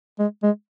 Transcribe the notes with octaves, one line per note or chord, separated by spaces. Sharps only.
G#3
G#3